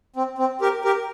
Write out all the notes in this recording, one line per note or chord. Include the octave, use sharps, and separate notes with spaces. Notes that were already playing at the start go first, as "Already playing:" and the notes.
C4
C4
G4 A#4
G4 A#4